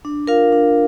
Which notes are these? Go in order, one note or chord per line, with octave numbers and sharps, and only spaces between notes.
D4
F4 A#4 F5
D4